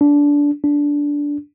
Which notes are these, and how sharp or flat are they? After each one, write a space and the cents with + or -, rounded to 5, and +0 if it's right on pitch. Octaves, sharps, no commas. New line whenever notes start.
D4 -20
D4 -15